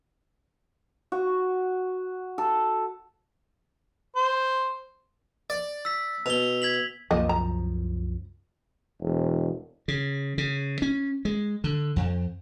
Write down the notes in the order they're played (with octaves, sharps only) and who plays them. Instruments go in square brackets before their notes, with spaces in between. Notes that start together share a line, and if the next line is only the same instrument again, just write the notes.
[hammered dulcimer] F#4
A4
[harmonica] C5
[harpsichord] D5
[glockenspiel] E6 B6
[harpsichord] B2 [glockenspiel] F7 G7
[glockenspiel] G#6 B6 F#7
[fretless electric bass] C2 F#2 F3 [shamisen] A#3 D#5
[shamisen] A#5
[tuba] E1
[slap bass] C#3
C#3
C#4
G#3
D3
F2